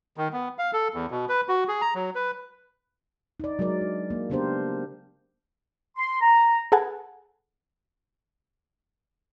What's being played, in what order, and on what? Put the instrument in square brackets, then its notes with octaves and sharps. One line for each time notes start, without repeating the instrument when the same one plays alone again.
[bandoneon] D#3
B3
F5
A4
E2
B2
B4
F#4
G#4
A#5
F#3
B4
[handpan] D#4 D5
F#3 G#3 D#4 A#4 D5
D4
A#3
C#3 B3 D4 G4 A#4 C5
[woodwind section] C6
A#5
[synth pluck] G#4 A4 B4 F#5 G#5 A5